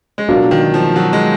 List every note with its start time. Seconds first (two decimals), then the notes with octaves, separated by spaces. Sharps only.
0.18 G#3
0.29 B2 F#3 A#3 D4 F4
0.51 D#3
0.74 F3
0.96 F#3
1.13 G#3